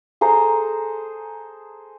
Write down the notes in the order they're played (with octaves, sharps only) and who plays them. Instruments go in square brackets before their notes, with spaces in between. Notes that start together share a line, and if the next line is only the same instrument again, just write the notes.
[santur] G#4 A4 C5 A#5